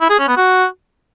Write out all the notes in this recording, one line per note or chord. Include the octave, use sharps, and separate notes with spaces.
E4
G#4
C#4
B3
F#4